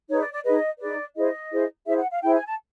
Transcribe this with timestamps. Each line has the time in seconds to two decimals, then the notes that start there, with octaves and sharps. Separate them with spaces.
0.09 D#4 G#4 B4 C#5
0.20 D5
0.32 D5
0.44 D#4 G#4 B4 D#5
0.80 D#4 G#4 B4 D5
1.16 E4 G#4 C5 D#5
1.51 E4 G#4 C5
1.87 E4 G#4 C5 E5
1.98 F#5
2.10 F5
2.22 E4 G#4 C5 G5
2.34 G#5
2.46 A5